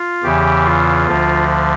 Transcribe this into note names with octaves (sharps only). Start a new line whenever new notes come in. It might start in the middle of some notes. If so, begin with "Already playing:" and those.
Already playing: F4
E2 C#3 E3 G4
F4
D2 D3 F3